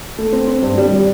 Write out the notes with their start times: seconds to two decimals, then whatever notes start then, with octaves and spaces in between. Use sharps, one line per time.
0.18 A3
0.32 C4
0.47 C4
0.62 G2
0.78 G3
0.93 G3